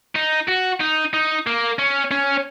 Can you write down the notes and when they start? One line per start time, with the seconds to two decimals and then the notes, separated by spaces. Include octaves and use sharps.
0.16 D#4
0.49 F#4
0.81 D#4
1.14 D#4
1.47 A#3
1.79 C#4
2.11 C#4